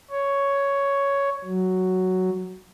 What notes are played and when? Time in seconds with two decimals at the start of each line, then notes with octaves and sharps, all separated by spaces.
0.11 C#5
1.44 F#3